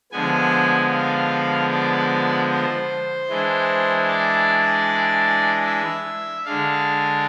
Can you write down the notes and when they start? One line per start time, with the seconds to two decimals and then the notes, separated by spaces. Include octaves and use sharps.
0.12 D3 F3 G#3 B3 G#5
0.91 F5
1.71 D5
2.50 C5
3.29 E3 G#3 D4
4.08 D5
5.66 E5
6.45 D3 G#3 D4 F5